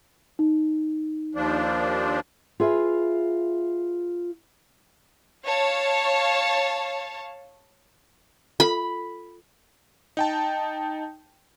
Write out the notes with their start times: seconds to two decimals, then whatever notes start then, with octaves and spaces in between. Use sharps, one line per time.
0.39 D#4
1.35 D#2 F3 D4
2.60 F4 G#4 B4 E5
5.45 C#5 F5 A5
8.60 F4 A4 B5
10.17 D#4 G5 A5